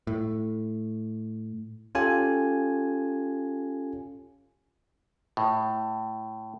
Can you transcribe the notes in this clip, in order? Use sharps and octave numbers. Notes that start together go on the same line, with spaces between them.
A2
C#4 F4 G4 A4 G#5
A2